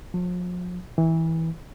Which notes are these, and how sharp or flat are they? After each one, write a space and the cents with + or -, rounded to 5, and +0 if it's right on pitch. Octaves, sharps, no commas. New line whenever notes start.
F3 +40
E3 -20